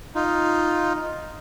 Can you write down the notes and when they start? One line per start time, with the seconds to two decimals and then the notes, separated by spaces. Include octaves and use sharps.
0.15 D#4 F4